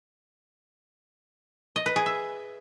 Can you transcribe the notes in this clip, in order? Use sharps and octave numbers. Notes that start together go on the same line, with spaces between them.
D#5
B4
G#4
E5